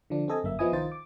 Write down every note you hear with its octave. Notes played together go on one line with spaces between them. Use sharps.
D3 F3 D4
C4 G4 A4 D#5 G#5
G1 F#2 A#3 E5
F3 B3 E4 D#5 G#5 D#6
C2 D#3 D#4 F4 C5 A6
D6